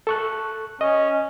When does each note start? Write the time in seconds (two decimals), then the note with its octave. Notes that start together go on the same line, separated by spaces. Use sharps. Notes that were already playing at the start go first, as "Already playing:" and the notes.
0.07 A4 C#6 F#6
0.81 C#4 D#5